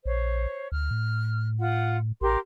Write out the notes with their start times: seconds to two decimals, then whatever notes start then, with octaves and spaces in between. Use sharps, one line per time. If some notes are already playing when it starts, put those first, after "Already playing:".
0.06 A#1 C5 C#5
0.72 D2 F6
0.91 A2
1.60 F4 F#5
2.21 A1 G4 A#4 C6